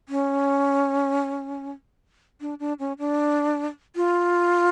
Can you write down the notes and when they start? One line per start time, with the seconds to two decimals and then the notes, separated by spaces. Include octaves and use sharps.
0.09 C#4
2.41 D4
2.60 D4
2.79 C#4
2.99 D4
3.96 F4